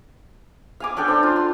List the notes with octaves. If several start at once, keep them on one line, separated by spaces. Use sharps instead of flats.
F5 G#5 D6
C#4 D4 A4 G5
D4 C5
F4
C6